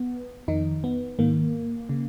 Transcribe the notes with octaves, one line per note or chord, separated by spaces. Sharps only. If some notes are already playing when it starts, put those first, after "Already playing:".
Already playing: B3
F2 D#3 D#4
B3
G#2 D#3 A#3
C#3